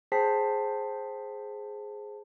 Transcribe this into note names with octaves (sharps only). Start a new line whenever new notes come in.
G#4 C5 G5 A5 B6 C7